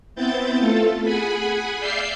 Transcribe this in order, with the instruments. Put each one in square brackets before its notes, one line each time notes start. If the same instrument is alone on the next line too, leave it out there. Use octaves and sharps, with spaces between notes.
[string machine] B3 C4 E4 G6 A6
A3 F4 A4
G#4 F#5 G#5 B5
D5 E5 F5 E6 G6 C7